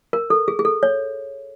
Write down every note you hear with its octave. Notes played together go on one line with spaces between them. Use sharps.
A#4
A4
G#4
G#4
A4
C#5